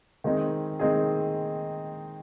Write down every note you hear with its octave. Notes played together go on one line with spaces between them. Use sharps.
D#3 G#3 C4 D#4 G#4
D#3 G#3 C4 D#4 G#4